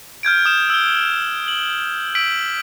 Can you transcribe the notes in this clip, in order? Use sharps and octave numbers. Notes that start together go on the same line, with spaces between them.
F6 G6 G#6 D7
D#6 E7
E6 G7
F#7
E6 B6 D7 F#7